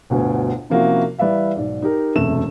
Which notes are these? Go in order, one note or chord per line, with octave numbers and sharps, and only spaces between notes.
G1 D2 B2 G#5
C3 F3 A#3 C#4 E4 F#4
E3 G3 B4 D5 E5 F5
B1 G#2 D5
D#4 G4 A#4
E1 F#2 C3 A3 E7